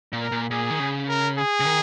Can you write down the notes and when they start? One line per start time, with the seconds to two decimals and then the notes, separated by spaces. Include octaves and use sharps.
0.13 A#2
0.21 A#4
0.32 A#2
0.51 A#2 G#4
0.70 D#3
0.79 C#3
1.09 A#4
1.38 G#4
1.60 C#3
1.66 D#3